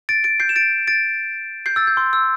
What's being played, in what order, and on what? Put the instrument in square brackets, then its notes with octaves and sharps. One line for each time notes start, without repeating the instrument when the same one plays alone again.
[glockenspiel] A6 D7
A6 D7
G6 C7
E7
A6 D7
A6 D7
G6 C7
E6 A6
G6
C6
E6